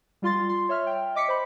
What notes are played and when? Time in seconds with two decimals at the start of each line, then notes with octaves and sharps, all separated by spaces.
0.22 G3 F4 C6 A6
0.49 C6
0.69 C#5 E5 F6
0.87 G5
1.15 D#5 D6 B6 C#7
1.28 C5 B5